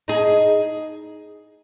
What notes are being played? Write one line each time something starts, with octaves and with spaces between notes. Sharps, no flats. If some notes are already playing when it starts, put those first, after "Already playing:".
D#4 G#4